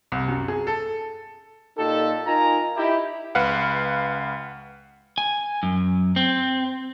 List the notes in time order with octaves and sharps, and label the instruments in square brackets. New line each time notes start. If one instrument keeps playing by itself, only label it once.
[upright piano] C2
F#2
G#4
A4
[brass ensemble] A#2 D#4 F4 G4 A4
D#4 F4 A#4 G#5 A#5
D#4 E4 G4
[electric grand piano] C#2 B4 F5 F#5
[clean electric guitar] G#5
F#2
C4